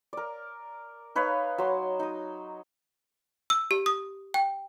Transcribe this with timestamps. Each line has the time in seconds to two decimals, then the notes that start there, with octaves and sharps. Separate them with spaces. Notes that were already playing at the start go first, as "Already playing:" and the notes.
0.13 A#4 D5
1.16 D#4 B4 C#5 F5
1.58 F#3 C6
2.00 D#4 D#6
3.50 E6
3.71 G4
3.86 D#6
4.34 G5